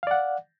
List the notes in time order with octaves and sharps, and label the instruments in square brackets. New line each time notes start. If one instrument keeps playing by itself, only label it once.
[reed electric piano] F5
D5
F#5